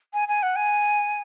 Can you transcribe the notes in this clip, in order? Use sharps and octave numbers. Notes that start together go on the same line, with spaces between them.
G#5
G#5
F#5
G#5